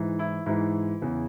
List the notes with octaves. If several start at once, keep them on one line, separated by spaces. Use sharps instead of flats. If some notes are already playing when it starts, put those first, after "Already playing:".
Already playing: G#2 E3
E4
G#2 E3 E4
E2 C#3 E3